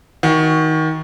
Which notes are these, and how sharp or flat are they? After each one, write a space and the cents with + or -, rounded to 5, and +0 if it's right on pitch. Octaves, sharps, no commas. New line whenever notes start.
D#3 +25 F#4 +0